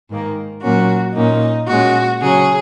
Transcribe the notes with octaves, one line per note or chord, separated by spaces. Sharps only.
G#2 D#3 A#3
A#2 F#3 A#3 C#4 F#4
A#2 A#3 C#4 D#4
A#2 G#3 C#4 F#4
C#3 F#3 C#4 G#4